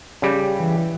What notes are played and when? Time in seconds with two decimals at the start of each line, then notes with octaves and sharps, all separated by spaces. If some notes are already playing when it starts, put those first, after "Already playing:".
0.22 C#3 G3 G4
0.58 E3